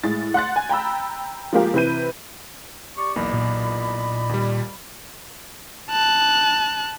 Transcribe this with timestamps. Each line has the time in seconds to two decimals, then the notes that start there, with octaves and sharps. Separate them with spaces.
0.04 A2 G#3 A6
0.34 F#5 C6 F#6 A6
0.56 G#5
0.69 G5 A#5 B5 E6
1.53 F3 G#3 A#3 F4 G4 A#4
1.74 C3 E3 B4 G6 D#7
2.97 G4 D5 C#6
3.16 B1 E2 A#3 D5 D#5 B5
3.33 A#2
4.29 D#2 G3
5.91 A5 F#6